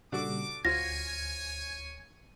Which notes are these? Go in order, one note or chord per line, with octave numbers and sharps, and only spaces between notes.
A#2 C#3 G3 D4 F#4 A4 D6
D2 F4 F#4 C5 C#5 G#5 A#6